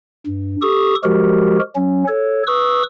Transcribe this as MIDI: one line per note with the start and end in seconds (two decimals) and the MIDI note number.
0.26 0.56 43
0.62 0.95 67
0.62 0.95 69
0.62 0.95 85
0.62 0.95 87
1.04 1.59 53
1.04 1.59 56
1.04 1.59 66
1.04 1.59 67
1.04 1.59 70
1.76 2.04 54
1.76 2.04 61
2.08 2.43 69
2.08 2.43 73
2.47 2.83 71
2.47 2.83 85
2.47 2.83 87
2.47 2.83 88